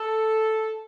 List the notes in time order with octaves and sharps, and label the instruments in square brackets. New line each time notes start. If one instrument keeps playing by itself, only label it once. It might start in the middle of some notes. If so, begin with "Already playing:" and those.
Already playing: [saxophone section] A4